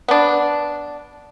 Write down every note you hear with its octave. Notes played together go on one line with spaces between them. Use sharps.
B3 D4